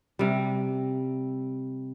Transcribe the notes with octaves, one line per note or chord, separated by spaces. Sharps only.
C3 G3